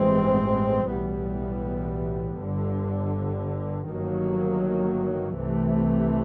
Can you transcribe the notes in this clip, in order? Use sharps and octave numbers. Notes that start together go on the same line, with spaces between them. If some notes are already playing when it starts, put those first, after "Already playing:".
Already playing: A1 G2 E3 G#3 C4
B1 A2 E3 G3 B3
G1 G2 D3
G1 G2 D#3 F#3 A#3
C2 C3 E3 A3